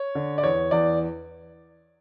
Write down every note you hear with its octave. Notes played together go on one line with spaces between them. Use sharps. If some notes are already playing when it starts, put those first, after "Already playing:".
Already playing: C#5
D3
D5
E2 C#5
E2 D5